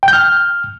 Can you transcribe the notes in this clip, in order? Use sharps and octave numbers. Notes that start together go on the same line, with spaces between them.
G5
G6
F6